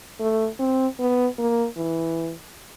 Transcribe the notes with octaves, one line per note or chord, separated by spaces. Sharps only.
A3
C4
B3
A#3
E3